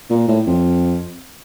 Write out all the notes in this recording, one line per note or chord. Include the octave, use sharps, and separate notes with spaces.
A#2
A2
F2